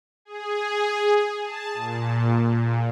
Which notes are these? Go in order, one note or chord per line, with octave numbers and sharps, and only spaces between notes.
G#4
A5
A#2
A#2